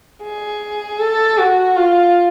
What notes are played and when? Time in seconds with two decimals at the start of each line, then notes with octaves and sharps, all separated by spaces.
0.23 G#4
0.99 A4
1.38 F#4
1.76 F4